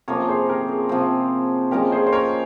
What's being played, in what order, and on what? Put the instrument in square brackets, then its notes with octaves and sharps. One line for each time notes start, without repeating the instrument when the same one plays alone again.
[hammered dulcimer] C3 F3 A#3 C#4 [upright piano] A#4 C#5
[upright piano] G#4 C5
G4 A#4
G#4
[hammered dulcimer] C3 F3 C4
[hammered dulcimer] A#2 F3 G#3 C#4 [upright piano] G4 A#4
[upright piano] G#4 C5
C5
A#4 C#5